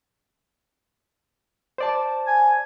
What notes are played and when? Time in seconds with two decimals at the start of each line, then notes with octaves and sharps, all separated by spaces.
1.78 C5 D5 A5
2.27 G#5